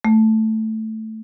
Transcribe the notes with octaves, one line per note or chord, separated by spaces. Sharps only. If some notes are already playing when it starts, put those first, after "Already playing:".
A3